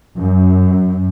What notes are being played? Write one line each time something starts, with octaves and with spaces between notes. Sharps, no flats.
F#2